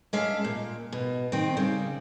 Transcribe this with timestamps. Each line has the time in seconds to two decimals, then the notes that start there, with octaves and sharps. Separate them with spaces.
0.13 G#3 C#4 D4 E5 F5
0.44 A#2
0.92 B2
1.32 D#3 C4
1.57 C#3 G3